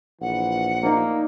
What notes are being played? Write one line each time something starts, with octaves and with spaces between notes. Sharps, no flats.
A#1 E3 F#5
A#3 D#4 D5